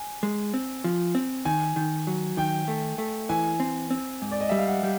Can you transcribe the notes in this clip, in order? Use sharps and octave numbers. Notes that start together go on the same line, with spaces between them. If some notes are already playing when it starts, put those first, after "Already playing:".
Already playing: G#5
G#3
C4
F3
C4
D#3 G#5
D#3
F#3
D#3 G5
A3
A3
E3 G#5
C4
C4
G#2
D5
D#5
G3 E5
F5
F#5
G3